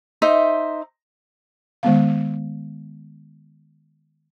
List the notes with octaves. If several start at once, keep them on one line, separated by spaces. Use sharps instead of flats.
D#4 C5 E5
D#3 G#3 B3 F5